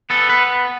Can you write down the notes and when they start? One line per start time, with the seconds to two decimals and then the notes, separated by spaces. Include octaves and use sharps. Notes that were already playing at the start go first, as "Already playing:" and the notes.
0.10 B3 A4
0.29 B4